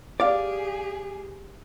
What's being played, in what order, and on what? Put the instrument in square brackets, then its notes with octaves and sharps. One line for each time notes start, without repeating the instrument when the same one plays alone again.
[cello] G4 G#4 [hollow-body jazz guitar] D5 F5